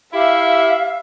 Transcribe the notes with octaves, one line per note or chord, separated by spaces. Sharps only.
E4 G4 E5 F5